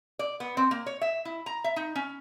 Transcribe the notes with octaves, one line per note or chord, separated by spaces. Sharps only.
D5
B3
C4
A#3
C#5
E5
E4
A#5
E5
D#4
C#4